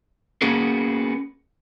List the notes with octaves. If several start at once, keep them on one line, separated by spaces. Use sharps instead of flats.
A#3 B3 C#4 F#4 G#4 A#4